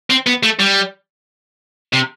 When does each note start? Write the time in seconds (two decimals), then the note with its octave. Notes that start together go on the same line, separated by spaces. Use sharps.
0.10 C4
0.27 B3
0.43 A3
0.59 G3
1.93 C3